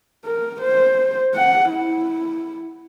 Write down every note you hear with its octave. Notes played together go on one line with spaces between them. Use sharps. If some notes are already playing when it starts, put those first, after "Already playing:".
A#4
C5
F#5
E4